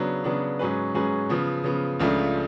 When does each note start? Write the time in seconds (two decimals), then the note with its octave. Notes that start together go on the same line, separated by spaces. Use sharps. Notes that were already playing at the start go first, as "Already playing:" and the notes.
Already playing: C#3 F#3 B3 D4
0.24 C#3 F#3 B3 D4
0.59 G#2 F#3 C#4 G#4 B4
0.94 G#2 F#3 C#4 G#4 B4
1.29 C#3 F3 B3
1.64 C#3 F3 B3
2.00 C#2 C#3 F3 A3 D4